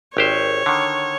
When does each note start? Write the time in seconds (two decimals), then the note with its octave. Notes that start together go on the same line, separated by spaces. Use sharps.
0.17 G#1 G4 C5 C#5
0.66 D3 D#3